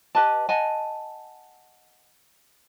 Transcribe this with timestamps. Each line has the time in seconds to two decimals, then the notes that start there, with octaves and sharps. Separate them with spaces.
0.15 G4 B4 D#5 A5
0.49 D#5 F#5 G#5 A5